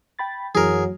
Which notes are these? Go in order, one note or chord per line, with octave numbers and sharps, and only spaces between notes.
G5 B5 A6
F#2 E3 F#3 G#4 A#4